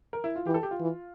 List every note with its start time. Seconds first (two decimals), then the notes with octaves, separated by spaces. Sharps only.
0.13 A#4
0.24 E4
0.36 F4
0.46 E3 G4
0.54 A4
0.63 G4
0.71 F4
0.80 E3